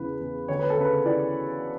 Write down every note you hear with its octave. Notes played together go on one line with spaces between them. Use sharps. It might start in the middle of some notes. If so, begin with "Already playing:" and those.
Already playing: E2 C#3 E3 B4
E2
D2 C#5
B4
A4
C#3 B4
E3 D5